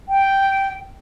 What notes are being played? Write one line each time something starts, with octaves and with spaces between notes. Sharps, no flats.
G5